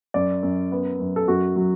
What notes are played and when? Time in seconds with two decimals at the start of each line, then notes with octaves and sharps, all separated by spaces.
0.14 F#2 D5
0.43 F#2
0.72 B3
1.00 F#2
1.16 A4
1.28 F#2 F#4
1.56 F#3